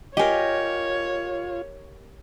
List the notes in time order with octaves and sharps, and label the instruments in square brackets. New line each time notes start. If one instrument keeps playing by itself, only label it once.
[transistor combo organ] F4 [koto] G4 A#4 [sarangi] C#5 [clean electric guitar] D#5 G#5